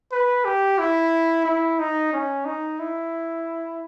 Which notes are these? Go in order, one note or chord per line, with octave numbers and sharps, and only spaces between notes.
B4
G4
E4
E4
D#4
C#4
D#4
E4